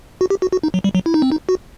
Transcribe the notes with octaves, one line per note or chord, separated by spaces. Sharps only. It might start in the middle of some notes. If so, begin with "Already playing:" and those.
F#4
G4
F#4
F#4
D#4
F#3
G3
F#3
E4
D#4
C4
D#4
F#4